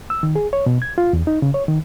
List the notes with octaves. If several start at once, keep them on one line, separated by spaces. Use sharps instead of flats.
E6
D#3
G#4
C#5
B2
G#6
F4
E2
D#4
C#3
C#5
D#3